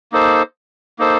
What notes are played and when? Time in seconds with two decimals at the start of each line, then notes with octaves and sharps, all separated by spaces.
0.12 A#3 D#4 A4 C5
0.99 A#3 D#4 A4 C5